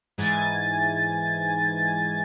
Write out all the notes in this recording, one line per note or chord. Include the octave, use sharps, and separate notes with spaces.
G#2 E3 G#5 A6